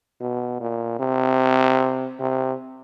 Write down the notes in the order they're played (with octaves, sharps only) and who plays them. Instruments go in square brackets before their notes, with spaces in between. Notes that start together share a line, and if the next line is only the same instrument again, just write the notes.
[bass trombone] B2
A#2
C3
C3